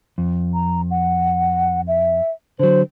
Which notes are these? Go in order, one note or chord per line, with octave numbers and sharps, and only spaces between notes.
F2
A#5
F#5
E5
D3 F#3 C5